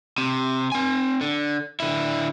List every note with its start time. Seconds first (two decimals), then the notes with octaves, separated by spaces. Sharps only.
0.18 C3
0.72 C4 G#5
1.21 D3
1.80 D3 E4